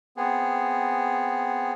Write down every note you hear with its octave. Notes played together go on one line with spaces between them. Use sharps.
B3 C4 G#4